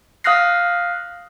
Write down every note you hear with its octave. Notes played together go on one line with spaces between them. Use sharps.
F5 D#6 F6 F#6 A#6 C7